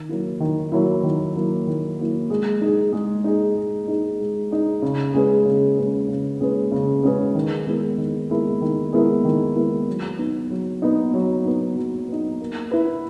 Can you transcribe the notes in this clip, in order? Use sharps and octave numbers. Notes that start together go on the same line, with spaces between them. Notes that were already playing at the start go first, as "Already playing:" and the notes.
Already playing: D#3
F#3 A#3 E4
D#3
F#3 A#3 E4
D#3
F#3 A#3 E4
D#3
F#3 A#3 E4
G#3
D#4 G#4
G#3
D#4 G#4
G#3
D#4 G#4
G#3
D#4 G#4
C#3
G#3 C#4 G#4 B4
C#3
G#3 C#4 G#4 B4
C#3
G#3 C#4 G#4 B4
C#3
G#3 C#4 G#4 B4
D#3
G#3 B3 E4 A#4
D#3
G#3 B3 E4 A#4
D#3
G#3 B3 E4 A#4
D#3
G#3 B3 E4 A#4
F#3
B3 D#4
F#3
B3 D#4
F#3
B3 D#4
F#3
B3 D#4
A#3
E4 B4